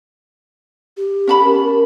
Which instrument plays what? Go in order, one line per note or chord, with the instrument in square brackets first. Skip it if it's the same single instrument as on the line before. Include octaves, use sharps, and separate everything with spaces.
[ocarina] G4
[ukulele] C#4 A5 B5
[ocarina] A#4